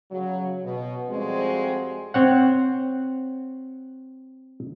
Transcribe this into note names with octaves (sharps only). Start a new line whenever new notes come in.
C#3 F#3
B2
F2 F3 G3 G#3 C4 F#4
C4 C#5 F#5